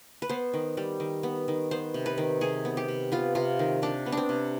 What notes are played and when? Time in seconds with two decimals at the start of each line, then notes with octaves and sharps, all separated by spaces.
0.22 B4
0.29 B3 C5
0.54 D#3
0.77 G3
1.00 D#3
1.23 B3
1.48 D#3
1.71 B3 C5
1.94 C3
2.06 B4
2.18 D#3
2.41 C3 G#4
2.65 B3
2.77 G4
2.88 C3
3.12 B3 F4
3.35 C3 F4
3.59 D#3
3.82 C3 D4
4.06 B3
4.12 C4 D4
4.29 C3